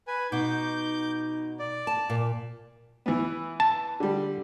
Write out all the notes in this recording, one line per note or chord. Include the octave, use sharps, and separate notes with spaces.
B4 G#5
B2 D#4 D6 G6
D5
A5
A#2
E3 B3
A5
D3 G3